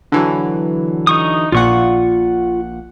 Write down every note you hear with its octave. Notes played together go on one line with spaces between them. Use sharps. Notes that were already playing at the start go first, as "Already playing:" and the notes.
D3 E3 F#3
D#4 C#6 D#6
A#1 A#2 F4 F#5 C#6